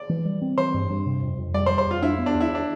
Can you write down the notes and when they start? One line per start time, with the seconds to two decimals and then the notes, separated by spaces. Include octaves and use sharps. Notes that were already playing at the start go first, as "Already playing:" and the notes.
Already playing: D5
0.09 E3
0.25 G3
0.42 C4
0.58 E3 C5
0.74 G2
0.90 G2
1.06 C3
1.23 F2
1.38 F2
1.54 G3 D5
1.66 C5
1.70 G3
1.78 C5
1.86 F2 F4
2.02 D4 E4
2.19 B3
2.26 D4
2.35 E2
2.40 E4
2.55 D4